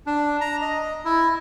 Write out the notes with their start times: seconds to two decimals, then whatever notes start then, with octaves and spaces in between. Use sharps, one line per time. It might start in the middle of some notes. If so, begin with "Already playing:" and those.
0.06 D4
0.41 A#5
0.62 D#5
1.05 E4